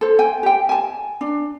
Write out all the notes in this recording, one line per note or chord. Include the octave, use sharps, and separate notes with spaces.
A4 C5
G5 G#5
G4 G5
G#5 A5
D4